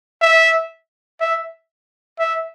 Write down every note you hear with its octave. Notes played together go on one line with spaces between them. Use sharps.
E5
E5
E5